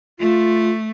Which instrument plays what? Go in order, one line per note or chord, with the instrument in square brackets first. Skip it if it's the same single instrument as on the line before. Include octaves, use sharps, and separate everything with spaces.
[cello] A3 [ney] F4